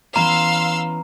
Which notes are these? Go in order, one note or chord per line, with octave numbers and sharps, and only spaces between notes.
E3 B3 C#4 F5 A#5 C6 E6